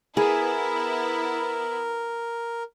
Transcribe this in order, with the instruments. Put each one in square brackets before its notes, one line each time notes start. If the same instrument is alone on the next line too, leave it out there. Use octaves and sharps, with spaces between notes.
[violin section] B3 E4 [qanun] G#4 [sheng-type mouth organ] A#4